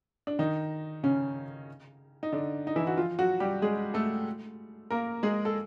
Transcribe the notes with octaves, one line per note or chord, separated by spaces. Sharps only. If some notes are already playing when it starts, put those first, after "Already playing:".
D4
D#3 D#4
C#3 C#4
D#4
D3 D4
D#4
E3 E4
F#4
F3 F4
F#3 F#4
G3 G4
G#3 G#4
A3 A4
A#3 A#4
G#3 G#4
A4